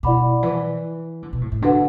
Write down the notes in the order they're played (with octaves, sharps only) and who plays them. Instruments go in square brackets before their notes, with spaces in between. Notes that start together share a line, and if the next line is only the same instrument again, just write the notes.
[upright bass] B2 [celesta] E4 D5 F#5 B5 D6
[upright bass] E3
D3
B2
A2
A2
[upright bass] D3 [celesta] D4 F#4 B4 F#5